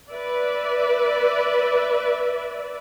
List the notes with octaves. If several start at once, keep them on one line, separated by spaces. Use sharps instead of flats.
B4 D5 E5